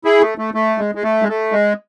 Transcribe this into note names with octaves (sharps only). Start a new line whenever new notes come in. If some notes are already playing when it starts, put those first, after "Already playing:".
E4 G#4
A3
A3
A3
G#3
G#3
A3
G#3
A3
G#3